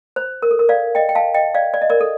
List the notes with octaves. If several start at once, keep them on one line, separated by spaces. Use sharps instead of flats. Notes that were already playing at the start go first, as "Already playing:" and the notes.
C5
A#4
A4
A#4
D5 F5
D#5 G5
G5
F5 A5
D#5 G5
D5 F5
D5
D#5
A#4 D5
A4